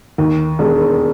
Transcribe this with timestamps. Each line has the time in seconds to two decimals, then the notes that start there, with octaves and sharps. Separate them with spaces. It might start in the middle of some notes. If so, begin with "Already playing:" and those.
0.18 D#2
0.59 E1